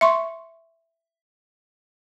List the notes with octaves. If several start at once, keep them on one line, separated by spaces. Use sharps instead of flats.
E5 C6 C#6